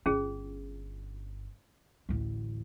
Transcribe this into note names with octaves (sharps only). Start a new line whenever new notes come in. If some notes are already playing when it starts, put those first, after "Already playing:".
G1 C#4 F4 G#4
A1 D2